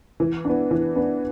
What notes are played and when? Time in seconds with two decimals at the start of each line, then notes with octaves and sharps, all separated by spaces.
0.20 E3
0.45 B3 D4
0.71 E3
0.96 B3 D4